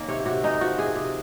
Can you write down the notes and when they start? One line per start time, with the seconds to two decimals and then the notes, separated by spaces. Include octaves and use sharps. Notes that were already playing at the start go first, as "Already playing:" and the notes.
Already playing: D#3 A#3 C#4
0.08 C3 C#5
0.26 C3 F#4
0.44 G#3 D#4
0.61 F3 F#4
0.78 C3 G#4
0.96 C3